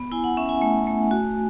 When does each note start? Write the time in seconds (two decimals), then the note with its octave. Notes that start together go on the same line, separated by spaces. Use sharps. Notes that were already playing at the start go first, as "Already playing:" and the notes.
Already playing: B3
0.12 E4 G#5
0.24 F#5
0.37 C#4 E5
0.49 G#5
0.62 A3
0.87 A3
1.11 F#4